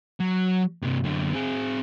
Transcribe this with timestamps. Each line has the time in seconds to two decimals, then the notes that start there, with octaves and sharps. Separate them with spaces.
0.20 F#3
0.82 G2 C3
1.04 F#2 D3
1.32 C4 G#4